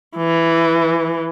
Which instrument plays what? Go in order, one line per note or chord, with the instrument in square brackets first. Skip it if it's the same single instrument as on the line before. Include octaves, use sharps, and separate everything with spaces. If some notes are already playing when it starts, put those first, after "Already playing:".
[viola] E3